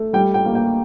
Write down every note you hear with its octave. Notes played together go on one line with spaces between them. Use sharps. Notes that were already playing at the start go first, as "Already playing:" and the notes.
Already playing: A3
G3 G5
G5
A#3
G5